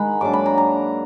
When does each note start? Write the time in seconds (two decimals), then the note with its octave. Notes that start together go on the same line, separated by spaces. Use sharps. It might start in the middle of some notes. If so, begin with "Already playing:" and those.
Already playing: D#3 G#3 D#4 F#5 B5
0.21 G#2 F#3 A#3 D4 D6
0.33 B5
0.46 A#5
0.58 A#5